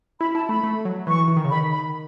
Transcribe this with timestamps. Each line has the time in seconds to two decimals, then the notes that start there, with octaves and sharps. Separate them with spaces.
0.20 E4 B5
0.34 E4 A5
0.49 A3 B5
0.64 A3
0.85 F#3
1.07 E3 C#6
1.28 E3
1.37 D#3
1.45 C#3
1.50 D#3 B5
1.71 B5